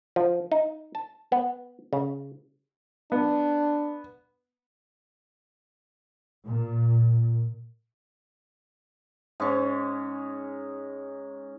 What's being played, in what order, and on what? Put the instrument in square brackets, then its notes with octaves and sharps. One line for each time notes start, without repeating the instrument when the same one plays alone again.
[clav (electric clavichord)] F3
D#4
A5
B3
C#3
[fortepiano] B3 [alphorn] D4
[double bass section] A#2
[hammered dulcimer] G#2 C#4